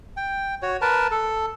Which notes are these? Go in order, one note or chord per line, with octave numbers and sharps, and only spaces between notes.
G5
F#4 C#5
A#4 B4 A5
A4